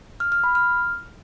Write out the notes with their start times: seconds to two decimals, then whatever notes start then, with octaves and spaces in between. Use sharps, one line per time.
0.20 F6
0.32 F6
0.44 B5
0.55 F6